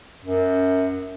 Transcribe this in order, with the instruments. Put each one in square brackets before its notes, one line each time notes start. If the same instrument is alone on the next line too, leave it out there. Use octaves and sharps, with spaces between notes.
[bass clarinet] F#2